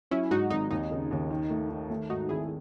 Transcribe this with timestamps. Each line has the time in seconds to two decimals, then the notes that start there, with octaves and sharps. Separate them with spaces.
0.11 F#3 C#4 E4
0.30 G#2 D#4 F#4
0.50 G#1 D#4
0.71 D#2 D#4
0.91 C#3
1.11 D#2
1.30 D#3
1.50 A3
1.70 D#3
1.90 A3
2.10 G#2 D#4 F#4
2.29 G#1 E4 G#4